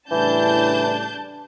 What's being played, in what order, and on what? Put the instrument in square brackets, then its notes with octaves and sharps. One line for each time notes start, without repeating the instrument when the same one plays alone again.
[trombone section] A2 C#3 G3 [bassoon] E3 [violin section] D4 A5 G6